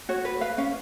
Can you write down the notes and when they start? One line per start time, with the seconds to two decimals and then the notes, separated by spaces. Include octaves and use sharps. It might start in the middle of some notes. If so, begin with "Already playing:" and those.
0.09 F#4 C#5
0.25 B4
0.41 B4 F5
0.58 C#4 F5